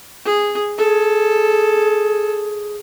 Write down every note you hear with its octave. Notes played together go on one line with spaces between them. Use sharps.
G#4
G#4 A4